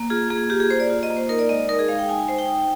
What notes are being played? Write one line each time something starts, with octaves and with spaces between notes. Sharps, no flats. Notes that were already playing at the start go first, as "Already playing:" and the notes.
Already playing: A#3
F4 G#4
A#3 G#4
F4 G4
G#4
A#3 C5
D5
F4
D#5
A#3
C5
D#4 A#4
D5
G#3 D#5
D5
D#4 A#4
G#4
G#3 F5
G5
D#4 G#5
G#5
G#3 C5
G5
D#4